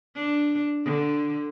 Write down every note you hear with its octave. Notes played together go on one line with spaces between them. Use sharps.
D4
D3